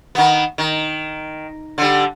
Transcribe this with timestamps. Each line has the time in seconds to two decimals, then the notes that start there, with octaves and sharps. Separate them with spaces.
0.15 D#3 B3
0.58 D#3
1.78 D3 G3